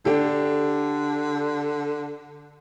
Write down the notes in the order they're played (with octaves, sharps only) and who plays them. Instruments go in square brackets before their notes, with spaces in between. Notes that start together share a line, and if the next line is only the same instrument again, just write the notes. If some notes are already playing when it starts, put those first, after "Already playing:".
[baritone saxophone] D3 [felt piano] D4 G4 A4